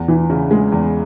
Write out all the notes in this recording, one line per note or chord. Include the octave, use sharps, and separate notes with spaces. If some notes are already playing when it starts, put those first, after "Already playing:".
Already playing: E2
E3
C#3
G#3
E2